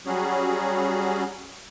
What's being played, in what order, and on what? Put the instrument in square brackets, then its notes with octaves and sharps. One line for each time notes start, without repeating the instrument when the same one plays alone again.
[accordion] F#3 G3 C#4 F#4 G#4